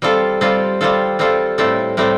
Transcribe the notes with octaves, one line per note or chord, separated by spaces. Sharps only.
G3 C4 F4 A4
G3 C4 F4 A4
G3 C4 F4 A4
G3 C4 F4 A4
A2 G3 C4 A4
A2 G3 C4 A4